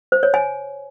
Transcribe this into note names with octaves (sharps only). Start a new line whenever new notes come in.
C5
C#5
G#5